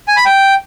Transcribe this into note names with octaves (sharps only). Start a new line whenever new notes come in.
G#5
B5
G5